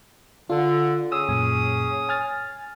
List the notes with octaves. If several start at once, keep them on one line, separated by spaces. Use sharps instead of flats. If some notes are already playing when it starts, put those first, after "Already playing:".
D3 F4 A4
C#4 G#4 D#6 E6
F#2 A#2 G#5
G#5 F6 A6